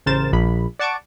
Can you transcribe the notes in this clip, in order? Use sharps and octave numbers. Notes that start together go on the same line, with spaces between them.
A1 C#3 A#4 C5 A6 E7
A#1 B5
D5 F#5 A5 C#6 D6 D7